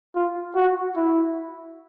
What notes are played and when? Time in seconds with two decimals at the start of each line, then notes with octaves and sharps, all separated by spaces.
0.15 F4
0.55 F#4
0.96 E4